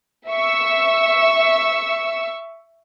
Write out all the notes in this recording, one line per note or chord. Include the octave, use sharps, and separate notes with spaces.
E5 C#6 E6